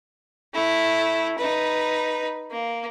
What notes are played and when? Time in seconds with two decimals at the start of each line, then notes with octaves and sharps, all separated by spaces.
0.54 A3 E4
1.38 D#4 B4
2.51 A#3